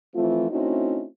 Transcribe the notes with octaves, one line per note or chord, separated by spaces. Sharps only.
E3 F3 A3 C4 F4
A3 C4 C#4 D#4 E4 F#4